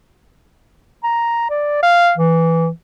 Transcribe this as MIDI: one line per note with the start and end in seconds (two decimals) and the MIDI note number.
1.04 1.49 82
1.50 1.80 74
1.83 2.12 77
2.18 2.68 52